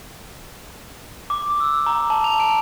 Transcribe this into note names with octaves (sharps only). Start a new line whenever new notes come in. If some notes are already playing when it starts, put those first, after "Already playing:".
D6
E6
A#5
A5
F7
D7